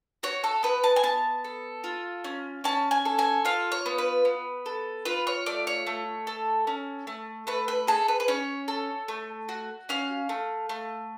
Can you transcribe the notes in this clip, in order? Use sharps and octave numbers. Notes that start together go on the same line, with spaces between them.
F#4 C#5
A4
B3 B4
A5
G#5
B3 A5
A4
F4
C#4
C#4 A5
G#5
A4
G#5
F4 F5
C#5
B3
B4
B3
A4
F4 B4
C#5
A3 D5
C#5
A3
A4
C#4
A3
A3 B4
B4
G#4 A4
B4
B4
C#4 C#5
A4
A3
F#4
C#4 F5
A3
A3